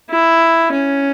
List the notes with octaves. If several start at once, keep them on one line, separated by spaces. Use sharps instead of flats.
E4
C#4